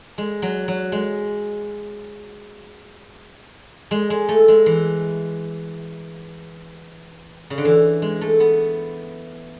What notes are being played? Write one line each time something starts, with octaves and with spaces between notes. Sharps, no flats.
G#3
F#3
F#3
G#3
G#3
G#3
A3
G#3
E3
C#3
D3
E3
G#3
A3
B3